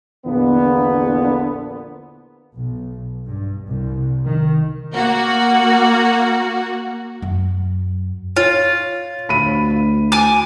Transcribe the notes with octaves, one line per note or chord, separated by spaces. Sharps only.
A#1 E2 A#2 D3 B3
B1
G2
C2
D#3
A#3 F#4
F#2
F4 C#5
D2 B5 D#7
G#5 D6